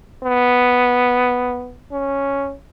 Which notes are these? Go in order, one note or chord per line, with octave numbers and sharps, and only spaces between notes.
B3
C#4